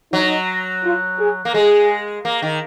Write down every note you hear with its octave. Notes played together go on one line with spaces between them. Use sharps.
F#3 D#4
F4
G#4
A#3
G#3 G#4
A#3
D#3